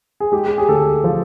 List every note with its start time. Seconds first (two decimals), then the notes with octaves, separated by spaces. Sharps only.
0.20 G#4
0.32 G#3 G4
0.47 G4
0.58 G#4
0.69 D2 A4
1.04 F3